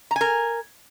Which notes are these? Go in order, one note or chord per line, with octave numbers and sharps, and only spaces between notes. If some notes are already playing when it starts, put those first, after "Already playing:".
A#4 G#5 A#5